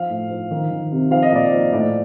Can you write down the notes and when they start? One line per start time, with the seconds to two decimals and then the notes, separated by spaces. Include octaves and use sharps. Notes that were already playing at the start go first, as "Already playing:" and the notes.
Already playing: F3 F5
0.09 A2
0.30 F3
0.51 D#3
0.70 D#3
0.92 C3
1.11 F3 F5
1.22 D#5
1.32 A#2 D5
1.45 D#5
1.52 F3
1.72 A2 D5